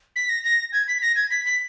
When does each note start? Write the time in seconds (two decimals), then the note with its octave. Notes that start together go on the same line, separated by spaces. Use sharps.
0.16 B6
0.29 A#6
0.44 A#6
0.72 G#6
0.88 B6
1.02 A#6
1.16 G#6
1.31 B6
1.46 B6